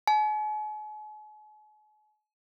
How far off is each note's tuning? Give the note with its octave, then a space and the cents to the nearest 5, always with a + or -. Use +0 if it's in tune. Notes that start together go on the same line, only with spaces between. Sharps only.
G#5 +45